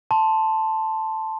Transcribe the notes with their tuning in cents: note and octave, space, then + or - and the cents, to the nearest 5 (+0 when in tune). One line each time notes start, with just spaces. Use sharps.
A5 +0 C6 +0